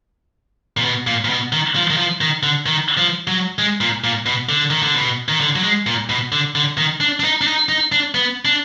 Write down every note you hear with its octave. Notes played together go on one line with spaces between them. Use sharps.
A#2
B2
A#2
A#2
B2
D#3
F3
D#3
F3
D#3
D3
D#3
F3
F#3
G#3
A#2
A#2
B2
D3
D#3
D3
B2
D#3
D3
F#3
G#3
A#2
B2
D3
D3
D#3
D4
D4
D#4
D4
D#4
D#4
D4
B3
D4